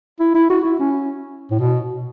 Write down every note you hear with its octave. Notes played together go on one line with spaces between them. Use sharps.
E4
E4
F#4
E4
C#4
A2
B2